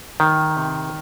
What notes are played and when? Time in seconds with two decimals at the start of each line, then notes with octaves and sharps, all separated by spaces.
0.20 D#3
0.57 C3